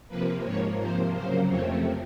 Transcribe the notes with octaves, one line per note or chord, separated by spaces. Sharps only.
C3 F3 A#3 B4
G#2 F3 A#3 C#5
C3 F3 A#3 C5
C#3 F#3 A#3 C5
F2 C3 F3 A3 C4 C#5